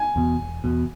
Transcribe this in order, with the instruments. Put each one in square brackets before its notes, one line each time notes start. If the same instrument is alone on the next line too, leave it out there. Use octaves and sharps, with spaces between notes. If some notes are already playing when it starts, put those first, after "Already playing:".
Already playing: [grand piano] G#5
[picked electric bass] E2 B2
E1
E2 B2